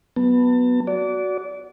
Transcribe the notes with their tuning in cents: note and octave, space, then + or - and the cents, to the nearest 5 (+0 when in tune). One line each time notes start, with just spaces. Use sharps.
F#3 +0 B3 +0 A5 +35
F#4 +0 D5 -25